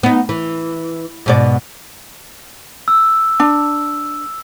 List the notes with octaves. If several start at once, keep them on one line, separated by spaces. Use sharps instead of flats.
B3 D#4
E3
G#2 B2 D5
E6
D4